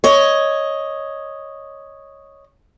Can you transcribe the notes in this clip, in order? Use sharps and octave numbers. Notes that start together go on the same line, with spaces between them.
C#5 D#5